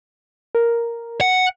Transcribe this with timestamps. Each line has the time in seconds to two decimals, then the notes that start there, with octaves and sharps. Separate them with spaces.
0.55 A#4
1.21 F#5